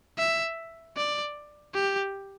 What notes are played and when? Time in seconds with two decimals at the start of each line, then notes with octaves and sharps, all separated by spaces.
0.18 E5
0.97 D5
1.75 G4